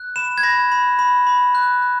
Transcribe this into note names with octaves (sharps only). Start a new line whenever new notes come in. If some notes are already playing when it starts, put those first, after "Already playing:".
Already playing: F#6
B5 E7
G#6
B5 A#6
B5
B5
B5
F#6
F#6